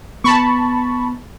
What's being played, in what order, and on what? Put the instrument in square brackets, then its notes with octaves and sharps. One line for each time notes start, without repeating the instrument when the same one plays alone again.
[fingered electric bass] B3 [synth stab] A5 B5 C#6